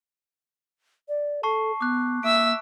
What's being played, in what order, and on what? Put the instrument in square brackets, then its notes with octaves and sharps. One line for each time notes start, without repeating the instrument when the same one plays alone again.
[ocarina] D5
[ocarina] A4 [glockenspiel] A5 C#6 C7
[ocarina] B3 [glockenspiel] D6 F#6
[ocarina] A#3 [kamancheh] E5 E6 [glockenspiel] D7